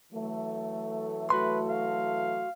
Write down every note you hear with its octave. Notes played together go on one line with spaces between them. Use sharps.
E3 F#3 A3
F#4 B4 C6
F5